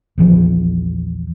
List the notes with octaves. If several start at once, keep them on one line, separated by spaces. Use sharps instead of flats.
A#1 E2 E3 F3